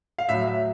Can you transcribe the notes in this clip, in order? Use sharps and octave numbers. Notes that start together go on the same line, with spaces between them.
F5
A2 F#3 E5
E5